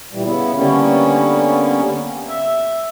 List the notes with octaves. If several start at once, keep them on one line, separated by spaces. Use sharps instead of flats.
A#2 E3 G3
C#3 B3 E4
D3 G3 A#3 B3 C#4
E5